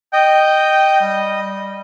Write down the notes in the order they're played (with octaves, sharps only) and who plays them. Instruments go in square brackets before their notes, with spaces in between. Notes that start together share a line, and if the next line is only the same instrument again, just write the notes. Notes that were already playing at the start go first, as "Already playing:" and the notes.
[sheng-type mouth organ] D#5 [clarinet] G5
[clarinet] G3